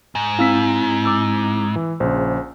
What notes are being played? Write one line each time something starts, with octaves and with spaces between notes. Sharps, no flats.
G#2
C4 E4 F5 E6 B6
D6 E6
E3
A#1 C#3 C5